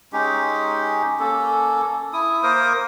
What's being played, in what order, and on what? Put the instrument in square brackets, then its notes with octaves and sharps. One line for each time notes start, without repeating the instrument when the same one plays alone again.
[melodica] G#3 C#4 D#4 G4
A#3 C#4 A4
E4 D#6
A#3 A#4 C5 D#6